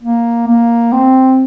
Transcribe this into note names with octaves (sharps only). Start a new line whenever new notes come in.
A#3
A#3
C4